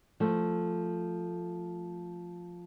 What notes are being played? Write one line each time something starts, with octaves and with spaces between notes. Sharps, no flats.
F3 A3